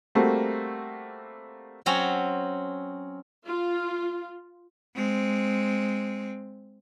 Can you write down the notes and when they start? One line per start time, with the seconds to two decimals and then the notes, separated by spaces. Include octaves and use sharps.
0.15 G3 A3 A#3 C4 F#4
1.86 F#3 C4 C#4 C#5
3.48 F4
4.95 G#3 C4